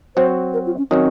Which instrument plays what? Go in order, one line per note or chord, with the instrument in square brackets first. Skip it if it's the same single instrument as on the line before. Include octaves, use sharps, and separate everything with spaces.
[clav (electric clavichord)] F#3 C4 F#4 [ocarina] C5
[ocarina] A#4
F4
C#4
[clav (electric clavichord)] D#3 F#3 C#4 F#4 [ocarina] C4